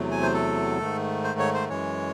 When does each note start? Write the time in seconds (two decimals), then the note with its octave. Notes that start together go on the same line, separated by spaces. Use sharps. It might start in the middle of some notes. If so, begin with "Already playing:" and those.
Already playing: E2 C3 F#3 A3
0.11 G#5
0.22 C5
0.34 A4
0.79 G#2 D#3 A3
1.24 C5
1.39 C#5
1.54 C5
1.69 F#2 E3 G#3 C#5